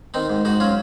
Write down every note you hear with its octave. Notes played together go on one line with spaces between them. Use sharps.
D#3 C4 D#4
G#2
G#2 D#4 F#4
F#3 C#4 F4